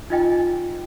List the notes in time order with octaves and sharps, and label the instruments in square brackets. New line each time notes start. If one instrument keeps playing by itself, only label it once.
[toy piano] D#4 F4 D#5 G5 G#5